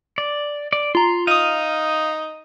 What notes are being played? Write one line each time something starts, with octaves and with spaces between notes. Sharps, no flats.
D5
D5
F4 A#5 C6
D#4 F5 D#6 D#7